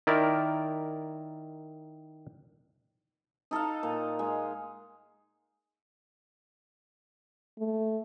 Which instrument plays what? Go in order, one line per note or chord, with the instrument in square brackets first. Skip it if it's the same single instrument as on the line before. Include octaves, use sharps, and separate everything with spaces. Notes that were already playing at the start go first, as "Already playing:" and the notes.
[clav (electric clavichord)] D#3 E4 A#4 D5
[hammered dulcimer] D#4 A4 D#5 F5
A#2
G#3
[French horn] A3